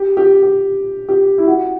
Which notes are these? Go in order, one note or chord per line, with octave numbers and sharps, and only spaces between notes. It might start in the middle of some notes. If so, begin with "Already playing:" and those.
Already playing: G4
G4
G4
G4
E4
F#4